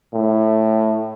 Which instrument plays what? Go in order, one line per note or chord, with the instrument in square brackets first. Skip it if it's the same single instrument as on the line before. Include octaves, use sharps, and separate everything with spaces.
[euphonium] A2